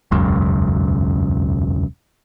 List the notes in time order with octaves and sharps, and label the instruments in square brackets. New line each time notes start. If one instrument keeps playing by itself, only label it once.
[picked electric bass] E1 C#2 F#2 C#3